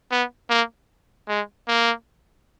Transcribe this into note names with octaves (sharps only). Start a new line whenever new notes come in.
B3
A#3
G#3
A#3